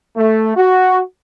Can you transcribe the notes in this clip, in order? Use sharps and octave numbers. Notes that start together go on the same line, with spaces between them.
A3
F#4